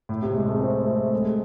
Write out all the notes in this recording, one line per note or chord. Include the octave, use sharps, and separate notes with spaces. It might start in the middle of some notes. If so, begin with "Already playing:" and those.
A2
C3
G#3
A3
C4
A3
G#3